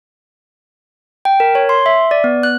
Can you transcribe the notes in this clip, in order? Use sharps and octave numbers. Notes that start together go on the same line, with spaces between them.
G5
A#4
C#5
C6
E5
D5
B3
F#6